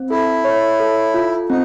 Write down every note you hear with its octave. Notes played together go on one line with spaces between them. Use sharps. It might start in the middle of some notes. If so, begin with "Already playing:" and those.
Already playing: C4
E4 A4
C#5
A4
F4
C4 D#4